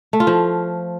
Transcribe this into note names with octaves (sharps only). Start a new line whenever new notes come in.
A3
F4
F3